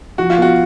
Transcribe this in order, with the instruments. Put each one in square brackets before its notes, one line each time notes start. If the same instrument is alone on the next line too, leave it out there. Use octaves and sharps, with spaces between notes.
[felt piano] F3 [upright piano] F#4
[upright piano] F4
[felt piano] B3 [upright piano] F#4